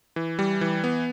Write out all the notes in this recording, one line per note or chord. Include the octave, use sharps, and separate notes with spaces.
E3
G3
E3
B3